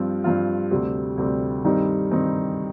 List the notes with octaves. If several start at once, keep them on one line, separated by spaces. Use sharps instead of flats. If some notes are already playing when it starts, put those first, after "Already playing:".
Already playing: G2 F3 C4 F4
G2 F3 C4 F4
D2 C3 G3 C4 G4
D2 C3 G3 C4 G4
G2 D#3 G3 C4 D#4
G2 D#3 G3 C4 D#4